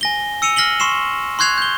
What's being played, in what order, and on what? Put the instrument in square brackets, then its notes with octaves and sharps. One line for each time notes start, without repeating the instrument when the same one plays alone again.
[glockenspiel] G#5 A#6 G7
E6 C#7 D#7 F7
F6 A#6 C7 F#7 G7
C6 C#6 C7 E7
C6 C#6 F#6 G#6 C7 F7
G6 G7